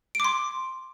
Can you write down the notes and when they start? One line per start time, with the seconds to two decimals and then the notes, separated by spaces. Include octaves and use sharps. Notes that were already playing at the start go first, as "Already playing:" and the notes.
0.15 D7
0.20 D6
0.24 C6